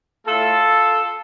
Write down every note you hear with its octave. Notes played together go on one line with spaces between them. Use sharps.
A2 A3 F4 A4